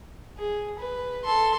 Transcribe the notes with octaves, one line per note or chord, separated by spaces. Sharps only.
G#4
B4
A4 C6